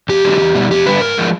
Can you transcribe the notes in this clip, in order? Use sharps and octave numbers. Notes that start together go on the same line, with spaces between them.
F2 G4
D3 F#3
E2
B2 G3
F2 G4
D3 G3 B4
G#2 A#4
F3 G#3